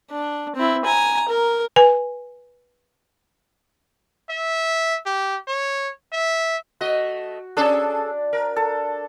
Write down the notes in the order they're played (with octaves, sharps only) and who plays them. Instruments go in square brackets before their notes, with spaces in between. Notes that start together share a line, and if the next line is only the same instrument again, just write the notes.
[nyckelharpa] D4
C4 E4
G#5 A#5
A#4
[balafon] B4 G#5
[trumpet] E5
G4
C#5
E5
[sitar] A3 D#5 [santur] F#4
[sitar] C#4 G#4 A4 [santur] D4 D5
[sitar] A#4
[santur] A4